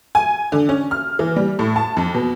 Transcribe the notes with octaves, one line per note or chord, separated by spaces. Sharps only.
G#5
D3
C#4
F6
E3
G3
A2
A5
F2
B2